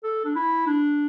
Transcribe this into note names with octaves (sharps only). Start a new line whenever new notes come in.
A4
D4
E4
D4